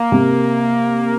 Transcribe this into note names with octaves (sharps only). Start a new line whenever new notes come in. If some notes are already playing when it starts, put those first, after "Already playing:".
Already playing: A#3
C3